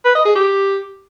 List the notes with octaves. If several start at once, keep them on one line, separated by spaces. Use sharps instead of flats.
B4
D#5
G#4
G4